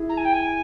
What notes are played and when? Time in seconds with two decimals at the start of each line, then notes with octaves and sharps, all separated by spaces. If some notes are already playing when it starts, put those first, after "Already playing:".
Already playing: E4 G#4
0.09 A#5
0.17 G#5
0.25 G5
0.33 G#5